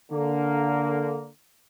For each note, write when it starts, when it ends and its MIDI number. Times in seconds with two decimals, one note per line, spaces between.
0.12 1.27 50
0.12 1.27 58